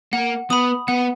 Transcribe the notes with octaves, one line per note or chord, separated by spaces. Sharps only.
A#3 F#5
B3 B5 D#6
B3 F#5